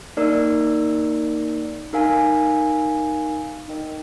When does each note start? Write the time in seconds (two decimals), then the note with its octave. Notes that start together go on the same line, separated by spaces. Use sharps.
0.17 A#3 D#4 A#4 D5
1.93 D#4 A#4 F5 G#5
3.68 D#4 A#4 D#5 G5